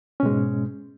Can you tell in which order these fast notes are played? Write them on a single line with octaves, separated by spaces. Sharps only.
C#4 B2 G#3 G#2